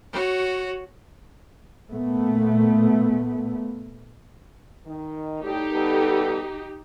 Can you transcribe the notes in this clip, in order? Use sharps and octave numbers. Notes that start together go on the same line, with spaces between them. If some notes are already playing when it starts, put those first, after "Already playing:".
F#4 C#5
A#2 A3 B3
D#3
A2 G3 D#4 G4 A4
G3 B3 A4